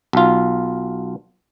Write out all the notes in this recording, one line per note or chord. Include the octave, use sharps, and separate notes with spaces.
B1 F4